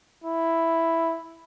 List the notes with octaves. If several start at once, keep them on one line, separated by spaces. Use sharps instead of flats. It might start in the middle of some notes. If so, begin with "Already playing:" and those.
E4